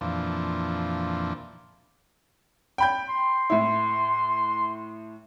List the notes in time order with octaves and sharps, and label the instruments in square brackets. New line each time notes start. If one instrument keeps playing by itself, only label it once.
[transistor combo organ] F2 A#2 E3 F3 D4
[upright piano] G5 B5 G6
[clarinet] C6
[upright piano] A2 E4